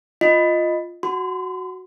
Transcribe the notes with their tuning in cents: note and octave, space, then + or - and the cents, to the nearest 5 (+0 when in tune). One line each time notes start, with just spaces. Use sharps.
F4 +0 D#5 +0
F#4 +0 C6 -45